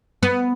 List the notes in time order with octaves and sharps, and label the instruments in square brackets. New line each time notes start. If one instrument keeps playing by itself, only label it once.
[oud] B3